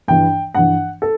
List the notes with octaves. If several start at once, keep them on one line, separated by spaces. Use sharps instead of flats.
G2 E3 G5
G2 E3 F#5
A4